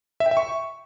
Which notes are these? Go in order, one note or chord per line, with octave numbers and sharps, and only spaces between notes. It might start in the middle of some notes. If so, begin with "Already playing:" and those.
E5
G5
E5
C#6